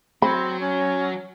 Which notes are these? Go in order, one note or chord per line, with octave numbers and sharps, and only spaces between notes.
F#3 C4 B5
C#4